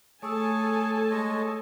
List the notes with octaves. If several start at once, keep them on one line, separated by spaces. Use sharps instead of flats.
A3 G#4 A4 C#5 G#5 A5 E6
G#3 C#5 D#5